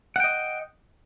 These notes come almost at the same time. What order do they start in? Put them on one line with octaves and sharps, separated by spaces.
F#5 G5 D#5